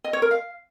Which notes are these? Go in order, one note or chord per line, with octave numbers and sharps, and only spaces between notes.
D#5
C#5
A#4
F5